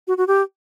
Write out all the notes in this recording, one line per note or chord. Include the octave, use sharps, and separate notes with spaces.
F#4
F#4
G4